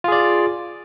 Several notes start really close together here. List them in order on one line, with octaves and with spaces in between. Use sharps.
F4 G#4 D5